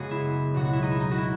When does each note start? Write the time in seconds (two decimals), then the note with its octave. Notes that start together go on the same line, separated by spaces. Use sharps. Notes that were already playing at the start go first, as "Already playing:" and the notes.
Already playing: F#2 C#3 G#3 B3 F#4 G#4
0.11 E4
0.54 C#2 B2 F#3 F#4
0.65 F#4
0.73 E4
0.83 D#4
0.91 E4
1.00 D#4
1.11 F#4
1.18 E4